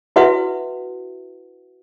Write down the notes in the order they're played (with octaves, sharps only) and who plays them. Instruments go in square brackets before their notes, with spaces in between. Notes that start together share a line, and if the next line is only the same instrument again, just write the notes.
[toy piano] E4 F#4 B4 E5 F#5